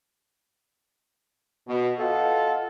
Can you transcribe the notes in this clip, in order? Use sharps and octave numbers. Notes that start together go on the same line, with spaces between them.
B2
F4 A4 D#5 F5 F#5